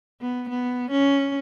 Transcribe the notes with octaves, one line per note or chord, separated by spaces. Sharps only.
B3
B3
C#4